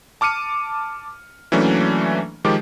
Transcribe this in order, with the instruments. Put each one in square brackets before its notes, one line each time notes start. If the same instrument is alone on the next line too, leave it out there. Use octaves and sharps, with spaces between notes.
[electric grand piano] A5 D6 F6 C#7 D#7
E3 F#3 A3 A#3 C#4 D4
D#3 F3 G#3 G4 D6